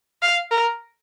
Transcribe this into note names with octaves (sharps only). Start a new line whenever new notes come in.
F5
A#4